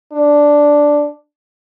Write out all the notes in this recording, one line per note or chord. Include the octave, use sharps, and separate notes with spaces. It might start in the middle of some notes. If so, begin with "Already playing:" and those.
D4